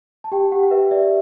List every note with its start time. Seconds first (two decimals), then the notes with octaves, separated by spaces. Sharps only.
0.24 A5
0.32 G4 G5
0.52 G4 F#5
0.63 F#5
0.71 B4 E5
0.91 D5 E5